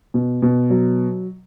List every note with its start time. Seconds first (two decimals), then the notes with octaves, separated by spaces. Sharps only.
0.14 B2
0.42 B2
0.70 F#3